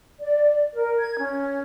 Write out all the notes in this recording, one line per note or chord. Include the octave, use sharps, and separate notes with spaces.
D5
A#4
G#6
C#4